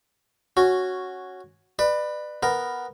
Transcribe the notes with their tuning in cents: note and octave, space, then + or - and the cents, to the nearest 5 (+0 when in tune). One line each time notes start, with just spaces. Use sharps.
C#4 -5 F#4 +0
B4 +0 D5 +35
B3 +0 A#4 +0